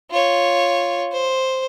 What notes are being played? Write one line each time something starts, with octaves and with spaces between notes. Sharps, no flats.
F4 C#5
C5